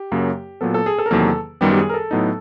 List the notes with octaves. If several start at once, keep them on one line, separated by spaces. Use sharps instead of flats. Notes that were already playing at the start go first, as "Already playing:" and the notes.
Already playing: G4
F#2 C#3 F#3 A#3
A#2 F#3 B3 A4
A4
G#4
A4
A#4
E2 C3 D#3 F#3 A#3 A4
F#2 D#3 G3 B3 G4
G4
G#4
A#4
A4
A2 F#3 B3 D#4